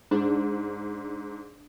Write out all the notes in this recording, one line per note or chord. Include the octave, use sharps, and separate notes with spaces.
G#2 D4